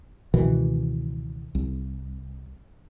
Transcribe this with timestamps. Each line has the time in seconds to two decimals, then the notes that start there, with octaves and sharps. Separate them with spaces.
0.34 C#2 B2 D#3 E3
1.55 C2